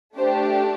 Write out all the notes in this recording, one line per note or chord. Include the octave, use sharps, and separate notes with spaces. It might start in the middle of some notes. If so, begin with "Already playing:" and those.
A3 D4 G4 C5